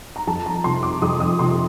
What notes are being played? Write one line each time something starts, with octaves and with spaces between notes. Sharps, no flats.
A#5
F2 A5
A#5
C3 F3 C6
D6
F2 D#6
D#6
C3 F3 C6